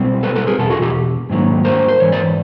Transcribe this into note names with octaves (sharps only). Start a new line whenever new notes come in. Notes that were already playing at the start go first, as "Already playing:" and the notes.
Already playing: B2 G3 C4
A4 B4
A4 B4
G#4 A#4
E2 B2 A4
F#4 G#4
G4 A4
G#2 D#3 F#3 A#3
A#4 C5
C5
G#2 E3 C#5
C5 D5